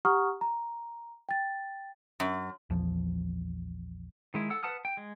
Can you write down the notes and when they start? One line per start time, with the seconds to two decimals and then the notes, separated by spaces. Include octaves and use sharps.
0.05 G4 F#5 A#5 C#6 D#6 F6
0.41 A#5
1.29 G5 A6
2.20 F#2
2.70 A#1 E2 F3
4.34 D#3 G#3 E4
4.50 A4 F#5 E6
4.63 B4 F#5 A5 D#6 F6
4.85 G5
4.97 G#3